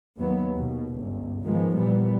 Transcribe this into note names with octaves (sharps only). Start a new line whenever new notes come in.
D#2 F#3 B3
D#2 B2
G1 C#2
G#2 D#3 F3 G#3 B3
A#2 E3 G3 B3